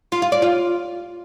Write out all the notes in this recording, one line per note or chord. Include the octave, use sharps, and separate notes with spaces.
F4
F4
D5
F4